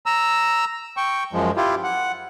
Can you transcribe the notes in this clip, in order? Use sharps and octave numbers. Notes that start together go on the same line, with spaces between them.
A#5 E6
G5 C#6
F#2 F3 G#3
E4 F4 G4
F#5